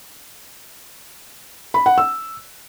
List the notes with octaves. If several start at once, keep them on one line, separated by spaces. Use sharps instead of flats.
B5
F#5
E6